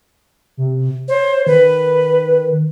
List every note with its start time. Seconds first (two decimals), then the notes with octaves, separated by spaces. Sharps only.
0.57 C3
1.08 C5 C#5
1.47 D#3 B4